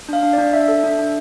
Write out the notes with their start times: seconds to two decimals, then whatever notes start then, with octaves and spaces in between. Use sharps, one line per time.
0.09 D4 F5
0.23 D4
0.33 D4 D5
0.53 D4 E5
0.68 A4
0.84 D4
0.99 D4